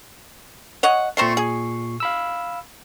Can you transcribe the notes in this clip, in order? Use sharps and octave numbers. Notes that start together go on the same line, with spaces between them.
C#5 D#5 F#5
A#2 A3 C4 C5 C#6 C7
G#4
F5 B5 E6